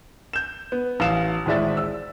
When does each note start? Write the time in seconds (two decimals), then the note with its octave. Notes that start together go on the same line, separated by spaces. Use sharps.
0.33 G6 E7
0.72 B3
1.00 A1 E3 F5 E7
1.46 G#1 A2 G#3 D5 E5 A6
1.77 E6